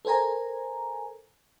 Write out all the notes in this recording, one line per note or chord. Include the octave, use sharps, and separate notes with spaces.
A4 A#4 C5 G#5 A#5